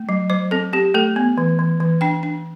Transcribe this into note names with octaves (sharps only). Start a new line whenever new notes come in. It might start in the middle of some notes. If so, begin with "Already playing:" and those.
Already playing: A3
F#3
F#3 C5
C4 A4
C4 G4
A3 A4
B3
E3
E3
E3
D4 G5
D4